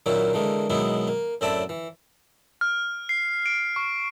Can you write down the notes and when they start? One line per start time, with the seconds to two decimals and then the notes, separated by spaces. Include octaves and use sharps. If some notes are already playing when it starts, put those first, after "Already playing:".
0.06 A#2 D#3 F#3 A#3 C#4 E4
0.33 D3 E3 G#3 A#3
0.70 B2 D#3 F#3 G#3 B3 E4
1.08 A#3
1.41 F#2 A2 C4 E4 D5 A5
1.69 E3
2.61 F6
3.09 C7
3.46 D7
3.76 C#6